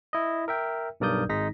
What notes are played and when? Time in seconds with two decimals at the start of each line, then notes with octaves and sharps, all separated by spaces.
0.13 E4 D#5
0.48 A#4 E5 G5
1.00 B1 G2 A#4 D5 D#6 G6
1.29 G#1 G#3 D#4 A#6 B6